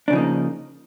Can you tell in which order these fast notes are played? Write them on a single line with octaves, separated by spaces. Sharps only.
D4 C#3 F3 D#4 A#3